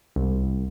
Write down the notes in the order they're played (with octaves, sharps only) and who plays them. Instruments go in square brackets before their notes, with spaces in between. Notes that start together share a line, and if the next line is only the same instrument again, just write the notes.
[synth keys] C2